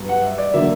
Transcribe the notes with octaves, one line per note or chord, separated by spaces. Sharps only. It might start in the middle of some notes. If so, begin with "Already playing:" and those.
Already playing: G2 F#3 B3
F#5
E5
D5
D3 F#3 A#3 E5